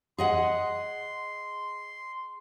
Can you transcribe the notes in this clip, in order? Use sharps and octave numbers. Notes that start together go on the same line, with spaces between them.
G#4 D#5 F#5 C6